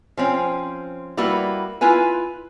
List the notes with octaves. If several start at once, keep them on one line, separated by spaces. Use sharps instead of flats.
F3 C4 C#4
G3 A#3 E4 F#4 B4
E4 F4 B4 G#5